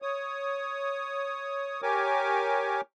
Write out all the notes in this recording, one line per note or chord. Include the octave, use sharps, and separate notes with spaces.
C#5 D#6
G4 A#4 C#5 G#5 D6